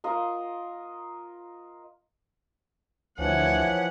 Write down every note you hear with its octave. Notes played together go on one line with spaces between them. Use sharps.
F4 A#4 D#5
D2 E3 F3 C#5 E5 F#5